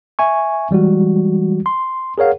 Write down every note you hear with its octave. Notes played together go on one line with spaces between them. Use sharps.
E5 G#5 C#6
E3 G3 G#3 F#4
C6
G#4 A#4 C#5 F5 F#5